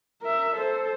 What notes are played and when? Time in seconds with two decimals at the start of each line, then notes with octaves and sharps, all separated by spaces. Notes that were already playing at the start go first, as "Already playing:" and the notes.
0.22 A#4 E5
0.55 A4 C5